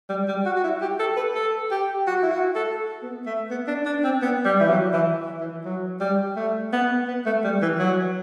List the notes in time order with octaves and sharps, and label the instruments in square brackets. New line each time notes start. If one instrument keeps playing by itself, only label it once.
[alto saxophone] G3
G3
F#4
F#4
E4
G4
A4
B4
A4
G4
F#4
E4
F#4
A4
B3
A3
B3
D4
D4
C4
B3
G3
E3
F#3
E3
E3
F#3
G3
A3
B3
B3
A3
G3
E3
F#3